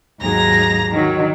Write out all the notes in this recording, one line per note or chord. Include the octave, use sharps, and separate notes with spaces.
D#2 G#2 F#3 G#4 A#5 A#6
D#3 F#3